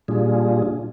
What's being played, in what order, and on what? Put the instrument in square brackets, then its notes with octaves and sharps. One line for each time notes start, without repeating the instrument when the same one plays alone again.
[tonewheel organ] A#2 G3 D4 F4 G#4